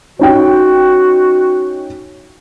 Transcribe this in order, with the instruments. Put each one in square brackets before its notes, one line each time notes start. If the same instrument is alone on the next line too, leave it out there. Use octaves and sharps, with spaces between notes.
[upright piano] C#4 D#4 G5 [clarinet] F#4